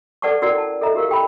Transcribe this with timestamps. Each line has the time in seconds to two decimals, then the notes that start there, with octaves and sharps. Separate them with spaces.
0.22 A4 B4 D5 F#5 A5 C#6
0.42 C#4 E4 F#4 A#4 B4 D5
0.58 A5
0.81 A4 D#5 E5 A#5
0.94 E4 F#4 G4 A#4 F5
1.09 G4 G5 B5